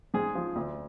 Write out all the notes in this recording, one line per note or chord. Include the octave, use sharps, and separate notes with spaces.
G#2 G#4
F3
D2